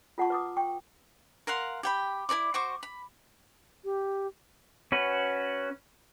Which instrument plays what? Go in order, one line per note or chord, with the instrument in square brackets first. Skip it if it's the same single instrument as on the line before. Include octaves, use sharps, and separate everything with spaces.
[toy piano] F4 A4 F#5 A5 A#5 C#6
B4 D6 D#6
G5 C#6
[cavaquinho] A#4 F5 F#5 C6
G4 G5 B5
E4 A#4 D5 D6
F#4 C5 C#6 D6
B5
[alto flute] G4
[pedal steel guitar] C#4 F#4 B4